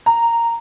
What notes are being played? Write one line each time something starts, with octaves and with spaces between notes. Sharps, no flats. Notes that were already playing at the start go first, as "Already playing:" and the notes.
A#5